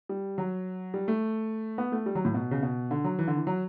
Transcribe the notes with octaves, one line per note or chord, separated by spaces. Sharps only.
G3
F#3
G3
A3
B3
A3
G3
F#3
A2
B2
C#3
B2
D3
F#3
E3
D3
E3
F#3